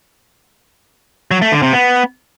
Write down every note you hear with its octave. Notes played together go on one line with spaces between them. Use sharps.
F#3
A3
D3
C3
B3